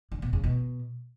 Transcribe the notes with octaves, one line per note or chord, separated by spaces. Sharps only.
D3
B2
C#3
B2